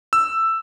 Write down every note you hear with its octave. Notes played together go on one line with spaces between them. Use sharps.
E6